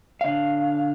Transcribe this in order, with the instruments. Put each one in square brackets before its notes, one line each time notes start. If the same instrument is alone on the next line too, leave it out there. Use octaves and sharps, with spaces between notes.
[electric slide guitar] D3 F5